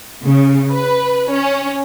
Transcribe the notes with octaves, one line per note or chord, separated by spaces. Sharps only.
C#3
B4
C#4